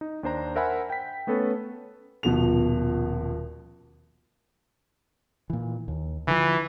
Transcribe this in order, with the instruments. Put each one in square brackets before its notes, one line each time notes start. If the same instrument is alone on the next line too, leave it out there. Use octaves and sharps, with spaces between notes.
[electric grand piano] D#4
D#2 D4 C5 A#5
A#4 C5 E5 F#5 G#5 B5
G5 B6
A3 B3 C#4 A4 B4 C#5
[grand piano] D#1 B2 F3 F#4 F7
[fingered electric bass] A#2 E3
D#2
[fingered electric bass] D3 F3 [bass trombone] E3